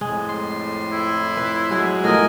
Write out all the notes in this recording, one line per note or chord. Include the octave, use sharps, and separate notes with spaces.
F2 A2 G#3
C6
E4
B4
F#3 G#3
A2 F3 B3 A#4 D#5 G#5